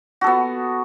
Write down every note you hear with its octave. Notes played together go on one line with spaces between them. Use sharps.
B3 F#4 A4